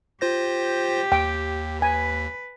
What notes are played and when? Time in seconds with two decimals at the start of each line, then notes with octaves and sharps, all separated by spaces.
0.21 F4 G4 C5 A#6
1.12 D#2 G5
1.82 B4 G#5